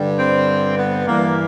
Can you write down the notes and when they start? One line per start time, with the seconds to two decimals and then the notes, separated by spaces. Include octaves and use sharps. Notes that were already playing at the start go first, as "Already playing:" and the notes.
Already playing: G2 D3 G3
0.18 C4
0.77 B3
1.07 G2 E3 G3 A#3